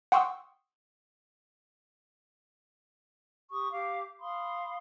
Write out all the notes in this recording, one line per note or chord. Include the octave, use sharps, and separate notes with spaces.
F#5 G5 C6 C#6 D#6 E6
G4 C#6 D#6
G4 F5 D6
F5 B5 C6 D#6